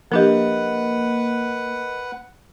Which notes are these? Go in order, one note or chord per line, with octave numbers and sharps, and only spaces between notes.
F3 A#3 D4 G4 A#4 B4 D#5 F#5